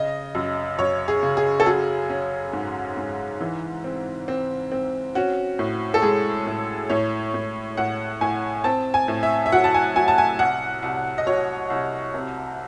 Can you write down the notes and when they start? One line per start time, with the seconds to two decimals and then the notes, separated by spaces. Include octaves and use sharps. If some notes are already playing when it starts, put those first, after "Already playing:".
Already playing: C#3 D#5
0.35 F#2
0.78 F#2 C#5
1.08 G#4
1.23 C#3
1.37 G#4
1.60 A4
1.66 F#3 G#4
2.09 C#4
2.53 G#2
2.97 G#2
3.41 E3
3.84 C4
4.28 C4
4.72 C4
5.15 C#4 F#4
5.59 A2
5.94 A4
6.02 G#3 G#4
6.46 A2
6.90 A2 C#5
7.34 A2
7.77 A2 F#5
8.21 A2 G#5
8.64 C4 A5
8.94 G#5
9.08 A2
9.23 E5
9.46 E5
9.52 F#3 F#5
9.64 A5
9.74 G#5
9.96 F#3 G#5
10.08 A5
10.18 G#5
10.39 C2 F#5
10.83 C2
11.18 D#5
11.27 F#3 C#5
11.70 C2
12.14 C3